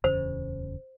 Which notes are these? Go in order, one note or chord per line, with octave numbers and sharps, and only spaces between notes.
D1 E2 C#3 C5